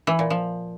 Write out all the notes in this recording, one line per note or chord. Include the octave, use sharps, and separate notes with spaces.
E3
A#2
F3